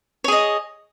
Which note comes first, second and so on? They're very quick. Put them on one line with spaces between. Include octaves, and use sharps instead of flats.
C#5 G#4 D#5